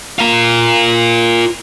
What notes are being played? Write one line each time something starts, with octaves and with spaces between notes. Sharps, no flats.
F4 A#4